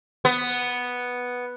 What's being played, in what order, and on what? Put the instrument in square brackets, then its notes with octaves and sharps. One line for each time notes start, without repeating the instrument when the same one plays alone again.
[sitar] B3